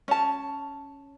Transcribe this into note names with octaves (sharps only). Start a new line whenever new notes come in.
C#4 A5